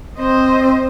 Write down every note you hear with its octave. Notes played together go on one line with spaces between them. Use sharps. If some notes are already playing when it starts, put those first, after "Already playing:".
C4 C5 D#5